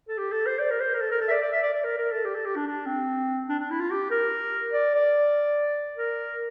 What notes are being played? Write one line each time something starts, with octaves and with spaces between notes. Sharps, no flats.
A4
G4
A4
C5
D5
A#4
C5
A#4
A4
A#4
A4
E5
D5
D5
E5
D5
D5
A#4
A#4
A4
G4
A4
G4
D4
D4
C4
D4
D4
E4
F4
G4
A#4
D5
D5
A#4